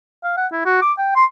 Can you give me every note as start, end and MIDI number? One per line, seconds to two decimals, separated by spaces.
0.24 0.37 77
0.37 0.47 78
0.52 0.62 64
0.65 0.81 66
0.82 0.92 86
0.98 1.15 79
1.16 1.25 84